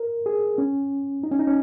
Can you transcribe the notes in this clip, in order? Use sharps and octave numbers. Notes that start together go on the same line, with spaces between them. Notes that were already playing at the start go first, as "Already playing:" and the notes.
Already playing: A#4
G#4
C#4
D#4
C#4
D#4
C#4